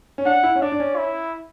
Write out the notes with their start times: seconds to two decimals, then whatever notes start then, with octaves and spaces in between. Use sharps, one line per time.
0.18 C#4
0.25 D4 F#5
0.43 E4
0.56 C#4
0.62 D4 D5
0.72 D4
0.80 C#4
0.97 E4